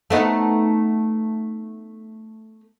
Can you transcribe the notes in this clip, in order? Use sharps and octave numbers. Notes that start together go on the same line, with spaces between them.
A3 B3 D#4